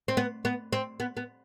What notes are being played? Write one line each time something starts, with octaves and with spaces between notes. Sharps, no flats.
C4
B3
B3
C4
B3
B3